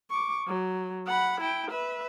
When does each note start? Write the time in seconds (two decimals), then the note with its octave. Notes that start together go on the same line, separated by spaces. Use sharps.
0.10 C#6 D6
0.47 F#3
1.07 F#5 B5
1.41 E4 G5
1.71 B4 E5